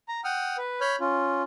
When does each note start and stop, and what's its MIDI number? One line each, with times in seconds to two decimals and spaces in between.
0.08 0.21 82
0.24 0.57 78
0.24 0.57 79
0.24 0.57 87
0.24 0.57 89
0.58 0.80 71
0.81 0.96 73
0.81 0.96 83
0.81 0.96 89
0.81 0.96 91
1.00 1.43 61
1.00 1.43 65